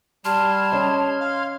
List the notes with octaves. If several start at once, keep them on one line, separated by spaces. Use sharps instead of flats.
G3 A5 C6 F6 G#6
C#4 C#5 D#5
F5